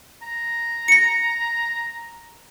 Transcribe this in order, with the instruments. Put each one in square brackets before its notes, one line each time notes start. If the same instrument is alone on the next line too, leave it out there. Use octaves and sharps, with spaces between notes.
[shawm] A#5
[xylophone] A#6 C#7